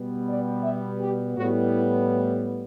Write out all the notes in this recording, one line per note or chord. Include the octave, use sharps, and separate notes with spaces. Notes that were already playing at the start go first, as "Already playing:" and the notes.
Already playing: B2 G3 B3
D5
E5
G4
A2 G3 B3 F#4